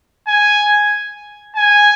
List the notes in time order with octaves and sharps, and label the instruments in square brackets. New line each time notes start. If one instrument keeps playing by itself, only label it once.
[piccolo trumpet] G#5
G#5